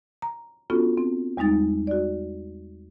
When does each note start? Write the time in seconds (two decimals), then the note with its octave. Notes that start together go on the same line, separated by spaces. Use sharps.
0.22 A#5
0.70 B3 C#4 D4 F4 F#4 A4
0.97 C4
1.37 E2 G3 G#3 D#4 A6
1.87 F#4 D5